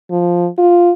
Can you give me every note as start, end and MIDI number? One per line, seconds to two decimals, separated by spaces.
0.11 0.49 53
0.58 0.92 65